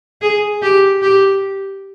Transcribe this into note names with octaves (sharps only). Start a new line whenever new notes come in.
G#4
G4
G4